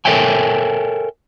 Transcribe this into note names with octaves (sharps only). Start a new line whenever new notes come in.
A4 A#4 C#5 E5 G5 G#5